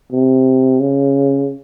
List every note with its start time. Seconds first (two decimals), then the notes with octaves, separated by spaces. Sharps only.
0.12 C3
0.80 C#3